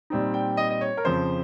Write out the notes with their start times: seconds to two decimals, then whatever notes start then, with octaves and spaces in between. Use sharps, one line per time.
0.10 A#2 G3 C4 D#4
0.34 G5
0.57 D#5
0.70 D#5
0.81 C#5
0.97 A#4
1.05 F2 C#3 F3 C5